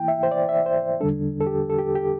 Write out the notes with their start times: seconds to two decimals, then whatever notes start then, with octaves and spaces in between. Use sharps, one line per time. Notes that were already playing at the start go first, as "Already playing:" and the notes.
Already playing: E3 A#3 E4 G5
0.08 E5
0.23 C5
0.31 D5
0.49 E5
0.66 C5
1.00 E2 D3 G3 D4 A4
1.41 A4
1.47 G4
1.70 A4
1.78 G4
1.95 G4